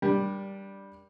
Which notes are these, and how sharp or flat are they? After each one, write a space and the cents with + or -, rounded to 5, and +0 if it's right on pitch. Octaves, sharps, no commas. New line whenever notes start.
G3 +0 D4 +0 A#4 +25